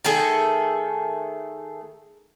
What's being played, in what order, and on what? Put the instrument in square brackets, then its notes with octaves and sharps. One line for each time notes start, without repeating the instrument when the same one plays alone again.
[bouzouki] D#3 A3 G#4 A4